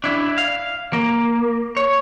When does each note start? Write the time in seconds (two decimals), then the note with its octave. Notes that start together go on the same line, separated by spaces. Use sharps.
0.04 D4 E4
0.38 F5
0.93 A#3
1.77 C#5